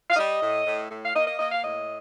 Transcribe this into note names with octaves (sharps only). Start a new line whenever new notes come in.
F5
G3 D#5
A2
A2
A2
F5
A#3 D#5
D#5
A#3 D#5
F5
A2 D#5